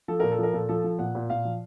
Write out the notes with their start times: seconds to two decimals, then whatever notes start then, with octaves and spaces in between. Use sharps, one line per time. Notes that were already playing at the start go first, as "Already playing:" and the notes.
0.08 F3 A4
0.20 A#2 A#4
0.31 A4
0.39 F3 A#4
0.53 A#2 A4
0.69 F3 A4
0.84 F3
0.99 A#2 F#5
1.15 A#2
1.29 A#2 F5
1.45 F3